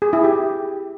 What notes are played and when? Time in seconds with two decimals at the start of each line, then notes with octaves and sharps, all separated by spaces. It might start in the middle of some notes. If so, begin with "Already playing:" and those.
0.02 G#4
0.13 E4
0.24 G4